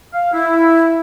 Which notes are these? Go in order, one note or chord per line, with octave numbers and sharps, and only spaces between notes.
F5
E4